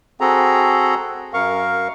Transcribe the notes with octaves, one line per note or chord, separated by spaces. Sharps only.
C4 F#4 G#4 A4 A#5
F#2 A#4 F5 C#6